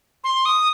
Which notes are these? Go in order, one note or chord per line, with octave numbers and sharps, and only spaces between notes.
C6
D#6